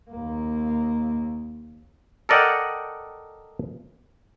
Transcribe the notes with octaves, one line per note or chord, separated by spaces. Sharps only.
D#2 A#3
A4 A#4 D5 D#5 F#5 G5